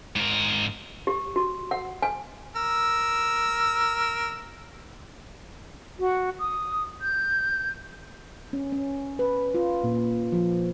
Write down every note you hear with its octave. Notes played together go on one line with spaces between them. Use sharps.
G#2 A#4
G4
F#4
F#5
G#5
A#4 E6
F#4
D#6
G6
C#4
C#4
B4
F4
A#2
F3